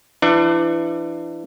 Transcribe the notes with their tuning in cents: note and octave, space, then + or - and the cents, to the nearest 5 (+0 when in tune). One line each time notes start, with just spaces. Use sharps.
E3 +30 D4 +30